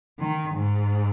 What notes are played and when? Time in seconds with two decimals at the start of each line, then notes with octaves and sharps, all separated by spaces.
0.19 D#3
0.55 G#2